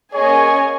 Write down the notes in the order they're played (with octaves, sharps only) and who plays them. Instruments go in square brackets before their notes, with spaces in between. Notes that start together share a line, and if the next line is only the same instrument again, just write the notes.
[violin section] A#3 C#4 G#4 D#5 G#5 [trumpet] C#5